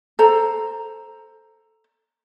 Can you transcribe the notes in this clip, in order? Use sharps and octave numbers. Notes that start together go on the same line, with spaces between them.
A4 C5 A#5